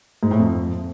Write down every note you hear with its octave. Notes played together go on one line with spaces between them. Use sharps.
G#2
A2
F2